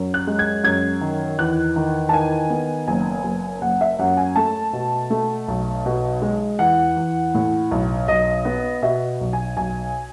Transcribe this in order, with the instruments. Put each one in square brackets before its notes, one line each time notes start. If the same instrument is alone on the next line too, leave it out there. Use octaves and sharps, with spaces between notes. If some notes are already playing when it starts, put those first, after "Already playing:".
Already playing: [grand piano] F#2
F#6
G#3
G#6
F#2 G#6
D#3
E2 F#6
D#3
A5
D#3 G#5
B3
F#1 G#5
F#1
F#1 F#5
E5
F#2 F#5
G#5
A3 A5
B2
A3
B1
B2
G#3
E2 F#5
E2
A2
B1
B1 D#5
B3
B2 E5
B1
G#5
B1 G#5